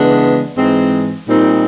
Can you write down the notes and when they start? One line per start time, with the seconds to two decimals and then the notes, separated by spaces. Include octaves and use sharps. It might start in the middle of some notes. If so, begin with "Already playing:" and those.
Already playing: C#3 E3 G#3 B3 D4
0.58 G#2 E3 G#3 C4
1.28 A#2 G3 C4 D#4